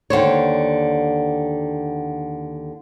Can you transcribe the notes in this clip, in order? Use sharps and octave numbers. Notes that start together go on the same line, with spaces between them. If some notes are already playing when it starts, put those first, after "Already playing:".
D#2 D3 C5 C#5